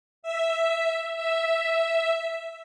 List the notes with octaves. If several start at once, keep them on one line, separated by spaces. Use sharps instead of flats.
E5
E5